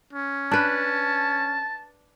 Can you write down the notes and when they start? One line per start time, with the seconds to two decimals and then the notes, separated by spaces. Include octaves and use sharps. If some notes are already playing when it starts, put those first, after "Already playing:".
0.13 C#4
0.51 D4 B4 A5